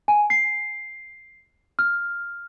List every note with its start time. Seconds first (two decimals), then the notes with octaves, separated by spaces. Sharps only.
0.08 G#5
0.30 C7
1.79 F6